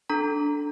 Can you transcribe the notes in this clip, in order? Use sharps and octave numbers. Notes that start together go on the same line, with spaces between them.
D4 A4 A#5